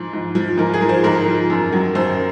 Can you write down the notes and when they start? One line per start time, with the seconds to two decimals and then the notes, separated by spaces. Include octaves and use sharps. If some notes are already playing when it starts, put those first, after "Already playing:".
Already playing: G#2 F3
0.13 G#2
0.35 F3
0.57 G#2 A#4
0.74 G#4
0.81 F3 A#4
0.89 C5
1.04 G#2 A#4
1.26 F3
1.50 F#2
1.72 D#3 F#3
1.95 F#2 C5